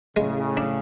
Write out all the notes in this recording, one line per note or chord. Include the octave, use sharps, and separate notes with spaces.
A2 C#3 G#3
D4